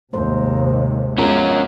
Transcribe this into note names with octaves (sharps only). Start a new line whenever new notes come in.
D#2 G#2 C3 G#3 A3 C5
F1 G#3 B3 C#4 F4 A#4